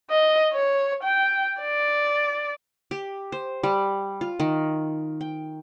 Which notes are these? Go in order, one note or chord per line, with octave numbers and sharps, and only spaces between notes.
D#5
C#5
G5
D5
G4
C5
G3
F4
D#3
G5